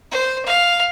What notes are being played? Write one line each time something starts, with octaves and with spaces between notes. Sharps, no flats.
C5
F5